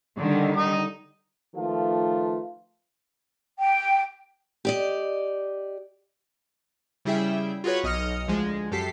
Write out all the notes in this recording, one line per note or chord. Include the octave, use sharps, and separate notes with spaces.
D3 D#3 G3
D#4 A#5 D#6
D#3 F3 A3 F4 A4 B4
G5
G4 D5 D#5
C#3 G3 E4 G#4 E5 G5
F4 F#4 G#4 B4 C#5
B1 D#5 D#6 F6 C#7
D2 F3 G#3
F#2 G4 A4 B6 C7